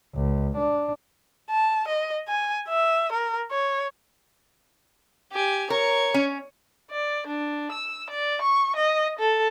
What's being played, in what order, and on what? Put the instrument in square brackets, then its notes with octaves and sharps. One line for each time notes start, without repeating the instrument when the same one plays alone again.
[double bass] C#2
D4
[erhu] A5
D#5
G#5
E5
A#4
C#5
[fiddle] G4 G#5
[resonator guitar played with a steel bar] A#4 [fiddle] C#5 C#6
[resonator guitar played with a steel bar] C#4
[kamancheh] D5
D4
E6
D5
C#6
D#5
A4